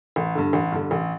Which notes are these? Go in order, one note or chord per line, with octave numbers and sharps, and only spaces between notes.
A1
G2 D3
A1
G2 D3
A1